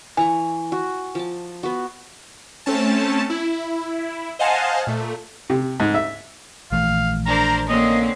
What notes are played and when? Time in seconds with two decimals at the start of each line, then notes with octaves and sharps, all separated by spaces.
0.17 E3 G#5 A#5 C#6
0.72 F#4
1.15 F3 A5
1.63 B3 F#4
2.66 A3 C4 C#4 A5
3.30 E4
4.39 C5 D#5 F5 F#5 G#5 A5
4.87 A#2 A3
5.50 C3
5.80 G#2
5.94 E5
6.72 A#1 E3 A3 F5
7.26 D4 A#4 C5 A#5
7.69 D3 A#3 C4 C#4 D#5